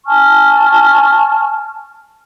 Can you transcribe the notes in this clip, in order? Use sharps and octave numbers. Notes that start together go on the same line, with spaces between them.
G#5 A5 C#6 F6